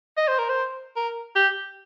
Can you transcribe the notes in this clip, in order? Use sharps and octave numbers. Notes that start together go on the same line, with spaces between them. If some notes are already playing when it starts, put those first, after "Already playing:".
D#5
C5
A#4
C5
A#4
G4